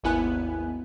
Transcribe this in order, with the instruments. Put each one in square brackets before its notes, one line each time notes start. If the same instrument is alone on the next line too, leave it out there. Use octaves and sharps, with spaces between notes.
[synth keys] G#1 D#2 B3 E4 G#5 F#6